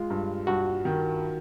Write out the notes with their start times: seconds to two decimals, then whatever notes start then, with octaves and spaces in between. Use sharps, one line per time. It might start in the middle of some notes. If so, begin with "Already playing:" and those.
Already playing: G#3 F4
0.10 G2
0.47 G2 F#4
0.85 D#3